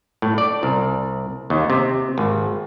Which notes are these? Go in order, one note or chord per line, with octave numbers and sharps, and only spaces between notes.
A2
D5
C2
D#2
C3
G#1